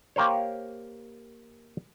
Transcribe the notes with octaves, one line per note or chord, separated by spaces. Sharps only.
A#3 G4 A#4 C5 C#5